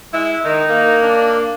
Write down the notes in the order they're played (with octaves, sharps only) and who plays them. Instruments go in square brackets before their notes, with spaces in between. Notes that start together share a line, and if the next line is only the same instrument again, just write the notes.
[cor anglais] G#3 [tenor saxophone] E4
[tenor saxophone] D#3 [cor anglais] D#4
[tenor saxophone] A#3
[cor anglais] D4